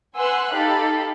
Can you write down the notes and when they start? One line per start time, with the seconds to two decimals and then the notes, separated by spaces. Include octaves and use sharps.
0.17 B4 F#5 G#5 C6 E6 F#6
0.55 D#4 G4 A4 F5 B5